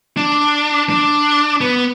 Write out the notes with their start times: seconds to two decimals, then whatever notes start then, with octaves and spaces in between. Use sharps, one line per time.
0.17 D4
0.90 D4
1.61 B3